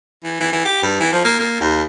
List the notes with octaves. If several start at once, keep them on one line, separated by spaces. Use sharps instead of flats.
E3
E3
E3
G4
G2
E3
F3
A#3
A#3
D#2